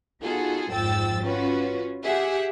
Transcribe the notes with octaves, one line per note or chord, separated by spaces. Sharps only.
B3 D#4 F4 F#4 G#4 A4
G#1 F2 F3 G5 E6 A6
C#4 F4 F#4 B4
G4 G#4 E5 F#5